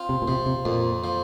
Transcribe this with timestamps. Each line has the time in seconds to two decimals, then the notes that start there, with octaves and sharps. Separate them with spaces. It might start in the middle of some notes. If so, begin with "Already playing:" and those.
Already playing: C4 F4
0.09 C3
0.22 A#2
0.28 C3 F3
0.46 C3
0.65 F2 A#2
1.04 F3